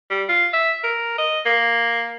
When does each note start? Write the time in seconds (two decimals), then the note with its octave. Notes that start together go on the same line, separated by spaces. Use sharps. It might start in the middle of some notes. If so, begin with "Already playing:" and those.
0.10 G3
0.29 F4
0.53 E5
0.84 A#4
1.18 D#5
1.46 A#3